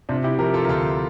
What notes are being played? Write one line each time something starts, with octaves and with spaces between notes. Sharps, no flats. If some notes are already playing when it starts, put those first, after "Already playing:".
C3 D4 F4
E4 G4
F3 G4 A#4
F4 A4
A#4
D2 F4 A4